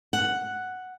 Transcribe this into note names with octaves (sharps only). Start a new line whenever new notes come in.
F#5